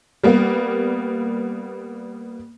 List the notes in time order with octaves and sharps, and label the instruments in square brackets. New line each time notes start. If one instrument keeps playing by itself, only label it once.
[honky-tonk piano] G3 A#3 B3